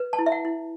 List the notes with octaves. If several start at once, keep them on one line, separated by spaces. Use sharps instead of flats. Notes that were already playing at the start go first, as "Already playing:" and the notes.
Already playing: B4
A5
E4
E5
F#5
E4